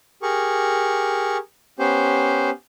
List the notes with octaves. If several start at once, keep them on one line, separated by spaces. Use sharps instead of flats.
G4 G#4 A#4 C#6
B3 C#4 G4 C5